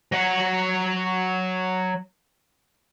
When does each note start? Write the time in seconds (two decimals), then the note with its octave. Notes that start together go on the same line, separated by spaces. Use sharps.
0.12 F#3 F#5